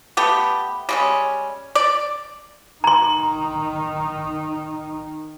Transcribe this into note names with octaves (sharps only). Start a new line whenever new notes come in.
A3 B3 G4
G3 G#3 C#4
D5
D#3 D#4 A#5 C6